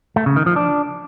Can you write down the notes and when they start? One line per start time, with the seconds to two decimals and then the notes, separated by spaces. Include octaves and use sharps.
0.16 A3
0.26 C#3
0.36 D#3
0.46 F3
0.56 D4